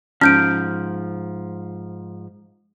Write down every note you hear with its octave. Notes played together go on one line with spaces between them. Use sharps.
G#2 F3 C#4 F6 G6 D7